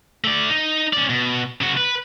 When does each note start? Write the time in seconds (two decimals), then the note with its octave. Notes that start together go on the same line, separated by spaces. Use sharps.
0.24 A3 D5
0.49 D#4
0.93 C#4 D5
1.10 B2
1.61 C#3 F#4
1.77 B4